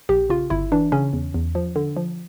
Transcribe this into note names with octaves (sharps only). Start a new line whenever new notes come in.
A#1 G4
C#3 F4
G1 E4
E3 D4
C#3 C#4
E2
E2
F3
D3
F3